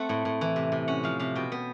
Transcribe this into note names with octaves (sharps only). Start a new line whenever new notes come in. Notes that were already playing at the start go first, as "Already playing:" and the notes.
Already playing: A3 C4 F#5
A2
A2
E3
C3
C3
C#4 F#5
F3 F5
C3 F5
B2 G5
B3